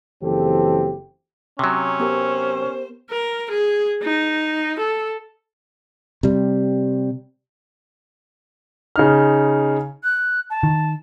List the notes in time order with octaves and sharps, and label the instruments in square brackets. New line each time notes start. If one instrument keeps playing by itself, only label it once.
[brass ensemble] F#1 E3 F3 C4 G4 A4
[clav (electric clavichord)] C3 F#3 [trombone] C#4
[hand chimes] B3 G4 A#4 [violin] C5
[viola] A#4
G#4
D#4
A4
[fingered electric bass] C3 G3
[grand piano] C#3 D#4 F6
[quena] F#6
A5
[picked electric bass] D#3